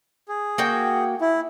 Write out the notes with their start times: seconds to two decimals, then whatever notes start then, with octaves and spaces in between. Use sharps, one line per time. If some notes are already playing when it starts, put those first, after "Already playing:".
0.28 G#4
0.58 A#3 F#4 G5
1.21 E4